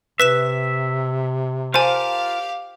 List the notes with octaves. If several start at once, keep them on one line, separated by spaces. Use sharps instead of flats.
C3 B4 E5 B6 E7
F4 G4 A#4 C5 F5 G#5 A5